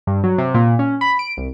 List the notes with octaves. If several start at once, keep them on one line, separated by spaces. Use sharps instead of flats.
G2
F#3
C3
A#2
C#4
B5
D7
C2